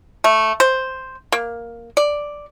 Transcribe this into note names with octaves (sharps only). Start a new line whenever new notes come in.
A3
C5
A#3
D5